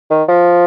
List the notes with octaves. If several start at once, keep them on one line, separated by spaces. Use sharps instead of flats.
D#3
F3